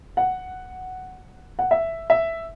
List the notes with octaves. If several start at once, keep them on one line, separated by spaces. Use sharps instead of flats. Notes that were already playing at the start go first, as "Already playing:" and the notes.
F#5
F#5
E5
E5